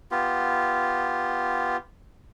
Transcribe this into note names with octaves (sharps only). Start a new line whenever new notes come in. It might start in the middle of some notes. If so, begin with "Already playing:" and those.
B3 F4 G4